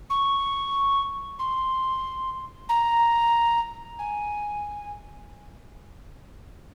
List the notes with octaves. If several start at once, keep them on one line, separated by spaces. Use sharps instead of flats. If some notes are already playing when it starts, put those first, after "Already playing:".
C#6
C6
A#5
G#5